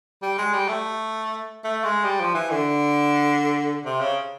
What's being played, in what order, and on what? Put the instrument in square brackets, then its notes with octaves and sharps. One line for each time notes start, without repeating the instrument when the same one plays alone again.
[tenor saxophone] G3
G#3
G3
A3
A3
G#3
G3
F3
E3
D3
C3
C#3